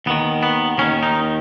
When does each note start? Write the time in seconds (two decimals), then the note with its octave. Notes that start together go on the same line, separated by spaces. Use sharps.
0.06 D#2 D#3 B3
0.43 B3
0.78 D#2 D#3 C#4
1.03 D#4